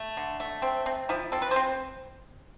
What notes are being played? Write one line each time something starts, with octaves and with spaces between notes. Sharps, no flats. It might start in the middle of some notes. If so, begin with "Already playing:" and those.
Already playing: A3
D3
A3
C4
C4
F3 E4
C4 A4
B4
C5
C4